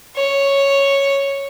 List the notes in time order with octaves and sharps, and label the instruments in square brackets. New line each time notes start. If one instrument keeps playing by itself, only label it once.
[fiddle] C#5